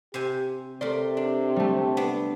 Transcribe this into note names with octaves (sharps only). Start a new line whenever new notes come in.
C3 G4 C5 G#5
C3 A3 A#4 D5 C6
D4
G3 A3
B3 D4